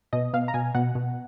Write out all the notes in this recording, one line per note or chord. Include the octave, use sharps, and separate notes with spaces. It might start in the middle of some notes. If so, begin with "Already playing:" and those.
B2 D#5
B2 F5
A#5
B2 G#5
B2 F#5
B2